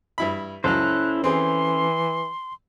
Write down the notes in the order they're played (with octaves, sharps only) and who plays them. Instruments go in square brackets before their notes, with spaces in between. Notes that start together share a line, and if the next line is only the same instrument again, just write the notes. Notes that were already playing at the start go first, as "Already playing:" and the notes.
[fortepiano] G2 E4 B5
[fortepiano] C#2 F#3 [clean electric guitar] C#4 A4 C5 [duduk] E4 [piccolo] F#6
[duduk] E3 [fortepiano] C4 G#4 [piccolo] C6